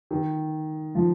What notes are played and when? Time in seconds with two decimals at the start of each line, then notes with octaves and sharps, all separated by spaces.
0.11 D#3
0.95 F3